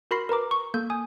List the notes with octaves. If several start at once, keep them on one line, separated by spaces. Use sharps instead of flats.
F#4 A#4 B5 C6 A#6 C7
A#4 B4 A#5 D6
C#6
A#3 A4 G6
G#5 D#6